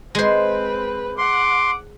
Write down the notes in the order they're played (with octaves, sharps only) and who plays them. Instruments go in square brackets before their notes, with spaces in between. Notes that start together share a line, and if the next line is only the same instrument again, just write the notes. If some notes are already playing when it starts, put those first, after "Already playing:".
[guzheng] G#3 C5 [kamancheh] C4 B4
[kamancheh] F#5 [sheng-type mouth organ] C6 [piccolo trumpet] D6